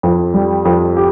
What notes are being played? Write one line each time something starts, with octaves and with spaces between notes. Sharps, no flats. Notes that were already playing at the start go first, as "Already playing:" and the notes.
F2
G3
F2
G4